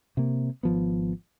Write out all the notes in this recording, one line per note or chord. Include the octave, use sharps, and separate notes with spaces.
C3 A#3
G#1 F3 B3